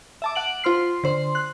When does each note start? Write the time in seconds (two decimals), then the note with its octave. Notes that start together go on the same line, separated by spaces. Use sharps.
0.22 E5 A5 D6
0.35 F#5 D7 F#7
0.64 F4 C5 C6 F6 C7
1.04 D3 C5 C6
1.35 F#6